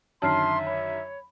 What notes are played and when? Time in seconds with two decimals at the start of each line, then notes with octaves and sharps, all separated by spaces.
0.22 F#2 D3 D#3 E5 A5 C6 F6 C7
0.67 C#5 B5